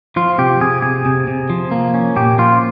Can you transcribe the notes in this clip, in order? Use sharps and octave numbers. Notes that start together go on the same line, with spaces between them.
F3 F4
C3 G4
C3 G#4
C3 G#4
C3
C3
F3
A#3
C#4
A#2 G4
F3 F4